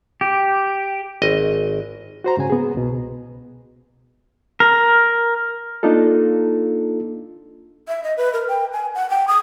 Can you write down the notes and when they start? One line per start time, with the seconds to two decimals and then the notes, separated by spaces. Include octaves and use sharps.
0.21 G4
1.22 G#1 D#5
2.24 F#4 C5 A#5
2.37 G#2 C#3 G#5
2.50 B3 G#4
2.74 C2 B2
4.60 A#4
5.83 A#3 D4 D#4 F4 A4
7.88 E5
8.04 D#5
8.17 B4
8.33 A#4
8.48 G5
8.73 G#5
8.95 F#5
9.10 G5
9.28 D#6